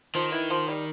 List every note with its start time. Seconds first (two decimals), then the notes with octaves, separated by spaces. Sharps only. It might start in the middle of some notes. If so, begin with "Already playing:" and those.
0.15 D#3 F3
0.32 E3
0.50 F3
0.68 G3